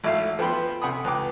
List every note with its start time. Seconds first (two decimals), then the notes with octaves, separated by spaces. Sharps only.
0.04 G#1 A3 E4 E5 F5
0.39 F3 B3 G5 B5 C6
0.82 C3 F#5 G#5 B5 D#6
1.04 C#2 B4 G5 D6